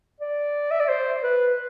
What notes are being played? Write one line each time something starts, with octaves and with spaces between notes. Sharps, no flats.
D5
E5
D5
C5
B4